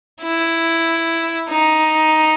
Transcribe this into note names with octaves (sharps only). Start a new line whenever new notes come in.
E4
D#4